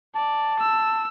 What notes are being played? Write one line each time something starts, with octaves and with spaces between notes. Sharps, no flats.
D5 A5
E6